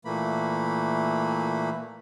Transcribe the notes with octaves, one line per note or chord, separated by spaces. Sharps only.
A#2 E3 A3 A#3 B5